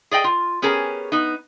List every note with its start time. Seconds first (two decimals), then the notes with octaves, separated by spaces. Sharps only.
0.11 G#4 D5 D#5 G5
0.24 F4
0.62 B3 C#4 G4 G#4 A#4
1.12 B3 D#4